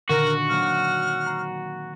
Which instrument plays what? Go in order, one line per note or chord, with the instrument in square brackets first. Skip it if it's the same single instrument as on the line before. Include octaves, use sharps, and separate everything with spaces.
[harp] A#2 D3 D#3 [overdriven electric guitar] F#4 [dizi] A#4
[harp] F#3 A#3 C4 [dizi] F6
[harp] A#5 C7